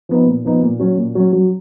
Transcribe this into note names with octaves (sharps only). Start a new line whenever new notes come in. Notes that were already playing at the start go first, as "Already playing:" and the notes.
F3 B3 D#4
A#2
F3 B3 D#4
A#2
F#3 C#4
A#2
F#3 C#4
F#3